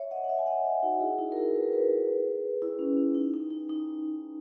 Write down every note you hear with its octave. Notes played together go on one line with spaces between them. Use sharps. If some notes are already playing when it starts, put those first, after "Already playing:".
Already playing: C#5 E5
D#5 F#5
F#5
C#5 E5
G#5
D#5 F#5
C#5 E5
D#4 F#4
E4 G#4
D#4 F#4
A#4
E4 G#4
B4
A#4
G#4 B4
E4
C#4
C#4
D#4
D#4
D#4
D#4